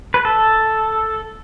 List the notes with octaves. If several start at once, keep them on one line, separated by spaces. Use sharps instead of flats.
B4
A4